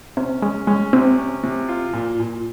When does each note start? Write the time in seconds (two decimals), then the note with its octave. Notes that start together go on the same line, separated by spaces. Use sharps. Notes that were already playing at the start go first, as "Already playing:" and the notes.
0.17 C3 C#4
0.42 G#3 C#4
0.67 G#3 C#4
0.93 C3 C4
1.18 C#4
1.44 C3
1.69 F4
1.93 A#2
2.20 A#2